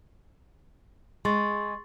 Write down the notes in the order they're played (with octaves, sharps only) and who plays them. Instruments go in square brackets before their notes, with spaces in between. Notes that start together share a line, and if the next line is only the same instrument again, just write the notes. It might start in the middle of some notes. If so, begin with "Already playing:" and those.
[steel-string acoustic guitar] G#3 [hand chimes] C6 C#6 A6